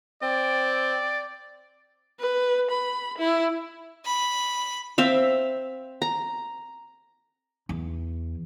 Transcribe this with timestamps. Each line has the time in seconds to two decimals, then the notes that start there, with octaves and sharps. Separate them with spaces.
0.22 C4 D5
2.20 B4
2.71 B5
3.18 E4
4.05 B5
4.98 C4 E5 F5
6.02 A#5
7.69 E2